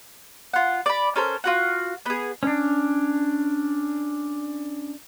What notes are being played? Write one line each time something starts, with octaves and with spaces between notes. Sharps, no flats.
F4 F#5
D5 B5
C#4 A4 A#4 C5
F4 F#4 F#5
B3 G#4
C#4 D4